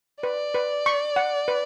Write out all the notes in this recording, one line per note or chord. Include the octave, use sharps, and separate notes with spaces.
B4 D5
B4
C#6
F#5
B4